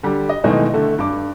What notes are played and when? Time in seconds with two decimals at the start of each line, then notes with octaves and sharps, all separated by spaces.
0.03 D3 G3
0.29 D#5
0.44 B2 D#3 E3 G#3 A3 D#4
0.74 D3 A3
0.98 G2 D6